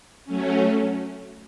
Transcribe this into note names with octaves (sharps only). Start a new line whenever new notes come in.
F#3 A3 C#4